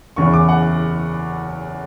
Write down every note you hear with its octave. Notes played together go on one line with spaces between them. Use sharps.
F#1 E2 C#3 E3 C#6
D6
F#5